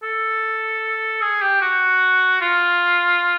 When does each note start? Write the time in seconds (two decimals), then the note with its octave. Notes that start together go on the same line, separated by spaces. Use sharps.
0.03 A4
1.21 G#4
1.41 G4
1.62 F#4
2.41 F4